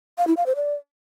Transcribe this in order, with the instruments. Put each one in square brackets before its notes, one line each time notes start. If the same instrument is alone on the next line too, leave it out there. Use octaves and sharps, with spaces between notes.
[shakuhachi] F5
E4
F5
C5
D5